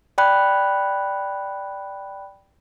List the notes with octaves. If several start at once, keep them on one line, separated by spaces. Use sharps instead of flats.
D5 G5 B5 F#6